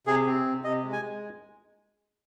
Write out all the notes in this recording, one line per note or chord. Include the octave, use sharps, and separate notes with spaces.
C3 G#4
C4
C3
C3 D#5
G#3
G#5
G#3